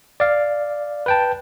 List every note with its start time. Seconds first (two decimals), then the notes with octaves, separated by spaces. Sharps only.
0.20 D5 F5
1.06 B4 G5 A5